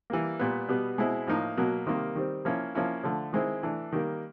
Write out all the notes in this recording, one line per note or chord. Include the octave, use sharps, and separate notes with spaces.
E3 G3 A#3
A#2 G3 B3
B2 G3 B3
B2 G#3 C4 E4
A2 F3 A#3 D#4
B2 F#3 A#3
C3 D#3 G3 A#3
D#3 G3 C4
F3 A#3 C#4 E4
F3 A#3 C#4 E4
D3 F3 A3
D#3 G#3 C4 E4
E3 A3 D4
D#3 G3 A#3